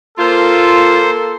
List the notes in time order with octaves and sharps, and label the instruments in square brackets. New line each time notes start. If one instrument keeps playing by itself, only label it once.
[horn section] A#3 A4 [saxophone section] F4 [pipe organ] C5